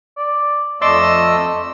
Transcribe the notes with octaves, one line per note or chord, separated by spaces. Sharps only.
D5
F2 A3 D5 D#5 C6 D6 E6